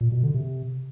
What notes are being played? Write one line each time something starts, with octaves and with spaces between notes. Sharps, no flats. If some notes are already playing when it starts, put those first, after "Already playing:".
A#2
B2
D3
C3